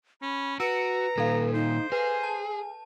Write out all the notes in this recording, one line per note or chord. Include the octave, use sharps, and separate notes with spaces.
C#4 B5
F#4 B4 A#5 E6 C#7 D7
A#2 D#3 A4 F5
D#4 C5
G#4 B4 G#5
A5